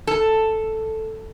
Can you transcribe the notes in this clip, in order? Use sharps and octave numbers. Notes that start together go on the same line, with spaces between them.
A4